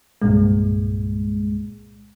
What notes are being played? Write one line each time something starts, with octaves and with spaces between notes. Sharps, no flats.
C2 G2 A#2 G#3